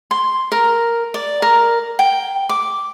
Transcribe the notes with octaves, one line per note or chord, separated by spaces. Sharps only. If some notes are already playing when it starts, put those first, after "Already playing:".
C6
A#4
D5
A#4
G5
D6